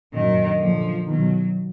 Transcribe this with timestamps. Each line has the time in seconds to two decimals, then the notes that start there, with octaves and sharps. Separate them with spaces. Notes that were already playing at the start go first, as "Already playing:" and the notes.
0.13 F#2 A#2 D#3
0.60 A#2 D3 F3
1.06 B2 D#3 F#3